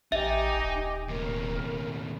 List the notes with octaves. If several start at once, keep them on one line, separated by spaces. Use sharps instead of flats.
A1 D#4 G4 D#5 E5 G#5
D#1
D#2 A2 A#4